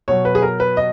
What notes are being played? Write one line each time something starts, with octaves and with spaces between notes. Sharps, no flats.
B2 F#3 C#5
B4
G#4
A#4
B4
D#5